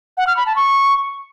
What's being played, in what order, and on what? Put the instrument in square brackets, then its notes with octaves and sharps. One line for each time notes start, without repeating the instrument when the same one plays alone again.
[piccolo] F#5
F6
B5
A5
C#6